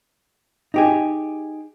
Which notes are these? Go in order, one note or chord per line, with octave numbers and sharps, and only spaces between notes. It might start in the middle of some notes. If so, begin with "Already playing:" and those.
D#4 G4 G#4